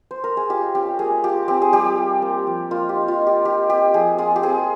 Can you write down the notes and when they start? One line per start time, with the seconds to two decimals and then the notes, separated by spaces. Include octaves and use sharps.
0.11 C5
0.24 A#4
0.37 G#4
0.50 F4 G4
0.75 C#4 G4
0.99 A#3 G#4
1.23 F4 G4
1.48 C4 G4
1.62 G#4
1.73 G3 G4
1.97 F4
2.22 A#3
2.47 F3
2.71 A#3 F4
2.89 G4
2.96 D#4
3.08 F4
3.21 D#4
3.27 G4
3.45 D#4 G4
3.69 C4 G4
3.94 F3 G#4
4.18 F4 G#4
4.36 G4
4.43 C4 G#4